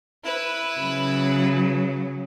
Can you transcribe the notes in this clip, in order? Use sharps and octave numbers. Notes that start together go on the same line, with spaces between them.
E4 B4
C#3 F#3